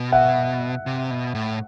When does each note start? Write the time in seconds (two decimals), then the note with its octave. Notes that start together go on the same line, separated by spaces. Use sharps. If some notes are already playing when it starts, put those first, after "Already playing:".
Already playing: B2
0.12 E5 F#5
0.86 C3
1.11 B2
1.35 A2